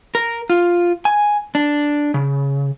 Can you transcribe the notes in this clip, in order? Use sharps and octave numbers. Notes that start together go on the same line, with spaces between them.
A#4
F4
G#5
D4
C#3